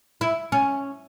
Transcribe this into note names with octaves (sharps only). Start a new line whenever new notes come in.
E4
C#4